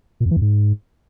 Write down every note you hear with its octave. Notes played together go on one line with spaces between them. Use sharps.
A#2
F2
E3
F2
G#2